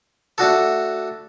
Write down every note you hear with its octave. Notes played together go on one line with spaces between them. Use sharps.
A3 D4 F#4 A4